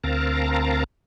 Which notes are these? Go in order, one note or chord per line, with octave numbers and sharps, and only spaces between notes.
D2 C4 A#4 F5 A5 A#5